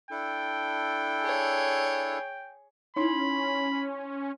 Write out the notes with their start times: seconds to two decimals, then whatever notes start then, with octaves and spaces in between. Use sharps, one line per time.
0.11 D4 E4 A4 G5
1.22 G#4 C#5
2.96 C#4 D#4 E4 C#5 B5 C6